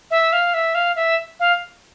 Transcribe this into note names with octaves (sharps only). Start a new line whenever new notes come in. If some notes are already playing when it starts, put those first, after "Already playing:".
E5
F5
E5
F5
E5
F5